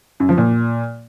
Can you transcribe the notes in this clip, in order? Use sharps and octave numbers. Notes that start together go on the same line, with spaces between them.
F#2
F3
A#2